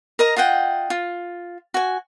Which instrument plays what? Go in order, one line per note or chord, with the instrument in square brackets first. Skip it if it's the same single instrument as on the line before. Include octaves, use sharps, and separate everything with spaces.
[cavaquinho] A#4 D#5 A#5
F4 D#5 F#5 G5
F4
F#4 G#5